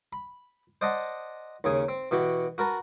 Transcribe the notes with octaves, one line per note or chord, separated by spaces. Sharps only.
B5
C5 D5 D#5 F#5 A5
D#2 C#3 G#4
C4
B2 E3 F#4 G4
F#4 A#4 B4 A5